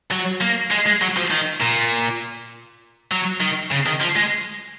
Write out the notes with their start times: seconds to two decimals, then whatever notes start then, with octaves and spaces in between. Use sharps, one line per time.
0.11 F#3
0.41 A#3
0.71 G#3
0.86 G#3
1.02 F#3
1.17 F3
1.31 D#3
1.61 A#2
3.11 F#3
3.41 D#3
3.71 C#3
3.86 D#3
4.01 F3
4.16 G#3